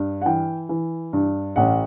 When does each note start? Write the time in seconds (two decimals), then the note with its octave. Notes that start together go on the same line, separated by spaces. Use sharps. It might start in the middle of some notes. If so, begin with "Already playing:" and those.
Already playing: G2
0.22 F#5
0.26 E3 G5
0.69 E3
1.13 G2
1.56 A1 F#5